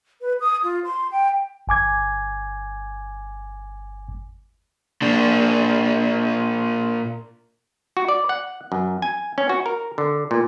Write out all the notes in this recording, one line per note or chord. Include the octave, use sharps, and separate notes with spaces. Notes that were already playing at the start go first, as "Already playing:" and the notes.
B4
D#6
F4
C6
G5
G1 G#5 D6 G#6
A#2 D4
F#4
D5
F#5
F#2
G#5
C#4
F#4
A#4
D3
A#2